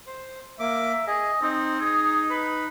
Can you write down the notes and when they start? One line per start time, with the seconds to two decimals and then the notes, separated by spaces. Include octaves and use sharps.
0.07 C5
0.60 A#3 E5 D6
1.07 G#4 D#5
1.42 C4 D#4
1.81 G#4
2.31 B4